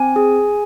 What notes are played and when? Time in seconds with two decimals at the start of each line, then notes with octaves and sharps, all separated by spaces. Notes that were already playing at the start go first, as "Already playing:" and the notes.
Already playing: C4 G#5
0.16 G#4